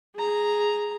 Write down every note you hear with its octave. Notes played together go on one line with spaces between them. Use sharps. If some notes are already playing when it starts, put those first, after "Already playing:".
G#4 A#5